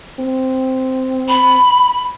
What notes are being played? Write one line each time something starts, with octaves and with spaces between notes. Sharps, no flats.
C4
B5